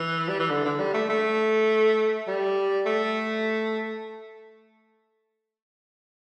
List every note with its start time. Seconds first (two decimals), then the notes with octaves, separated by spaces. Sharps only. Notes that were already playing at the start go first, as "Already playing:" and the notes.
Already playing: E3
0.28 G3
0.39 E3
0.50 D3
0.65 D3
0.79 G3
0.94 A3
1.09 A3
2.27 G3
2.86 A3